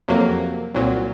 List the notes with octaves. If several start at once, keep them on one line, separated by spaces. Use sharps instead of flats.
F2 C3 F#3 A#3
C2 A#2 F#3